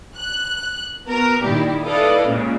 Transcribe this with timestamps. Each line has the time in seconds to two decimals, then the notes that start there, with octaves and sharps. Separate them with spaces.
0.16 F#6
1.07 B3 F#4 A#4
1.41 A#2 D#3 G3 E4 G4
1.84 E4 A4 B4 D5 D#5 F5
2.25 A#2 C#3 G#3